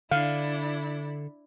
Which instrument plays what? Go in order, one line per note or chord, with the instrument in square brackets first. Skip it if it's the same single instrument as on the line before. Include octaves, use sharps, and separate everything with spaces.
[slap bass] D3 [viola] D4 E4 [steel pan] F5